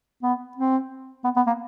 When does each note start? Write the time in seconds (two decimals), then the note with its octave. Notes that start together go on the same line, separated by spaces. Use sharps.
0.23 B3
0.57 C4
1.24 B3
1.37 B3
1.47 A#3